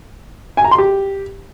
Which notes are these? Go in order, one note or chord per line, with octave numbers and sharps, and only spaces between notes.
G#5
A#5
C6
G4